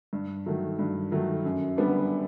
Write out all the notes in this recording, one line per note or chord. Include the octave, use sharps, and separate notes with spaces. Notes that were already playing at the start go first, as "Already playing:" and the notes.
G2
D#3 F#3 A3
G2
D#3 F#3 A3
F#2
D3 G3 B3 D4